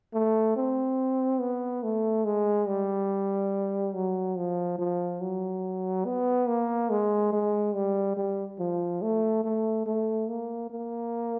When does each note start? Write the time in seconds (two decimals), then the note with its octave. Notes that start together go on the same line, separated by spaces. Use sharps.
0.14 A3
0.56 C4
1.40 B3
1.83 A3
2.25 G#3
2.67 G3
3.94 F#3
4.36 F3
4.79 F3
5.21 F#3
6.06 B3
6.48 A#3
6.90 G#3
7.32 G#3
7.75 G3
8.17 G3
8.59 F3
9.02 A3
9.44 A3
9.86 A3
10.28 A#3
10.70 A#3